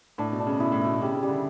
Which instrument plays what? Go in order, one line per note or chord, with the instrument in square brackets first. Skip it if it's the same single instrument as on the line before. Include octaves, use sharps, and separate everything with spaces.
[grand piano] A2 [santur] D4
[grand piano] B2
[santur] D4
[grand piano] C#3
[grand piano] B2 [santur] E4
[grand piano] A2
[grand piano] B2 [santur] E4
[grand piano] C#3 [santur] G4
[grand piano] C#3
[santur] G3
[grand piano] D3